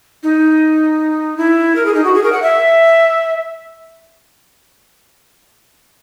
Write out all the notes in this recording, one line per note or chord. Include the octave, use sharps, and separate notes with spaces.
D#4
E4
A#4
G#4
D#4
F#4
G#4
A#4
F#5
E5